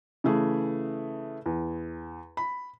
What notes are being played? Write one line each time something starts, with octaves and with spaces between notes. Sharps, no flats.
C#3 E3 A3 G#4
E2
B5